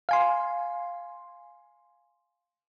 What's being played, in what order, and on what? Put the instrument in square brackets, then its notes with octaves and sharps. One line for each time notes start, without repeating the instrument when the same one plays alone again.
[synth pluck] F5 G#5 C6